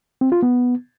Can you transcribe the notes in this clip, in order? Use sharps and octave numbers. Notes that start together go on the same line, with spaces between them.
C4
F4
B3